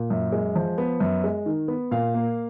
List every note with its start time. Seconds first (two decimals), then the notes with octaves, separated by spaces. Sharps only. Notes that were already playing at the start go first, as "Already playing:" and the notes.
Already playing: A#2
0.10 F#2
0.32 G#3
0.56 F3
0.78 B3
1.00 F#2
1.24 G#3
1.46 D#3
1.68 B3
1.91 A#2 F5
2.14 A#3